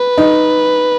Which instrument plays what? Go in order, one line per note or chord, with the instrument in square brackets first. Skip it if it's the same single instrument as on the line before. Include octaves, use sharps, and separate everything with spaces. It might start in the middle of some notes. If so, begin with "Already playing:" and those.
Already playing: [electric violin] B4
[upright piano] D#4